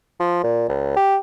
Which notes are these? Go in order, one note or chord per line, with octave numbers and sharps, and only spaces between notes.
F3
A#2
C#2
G4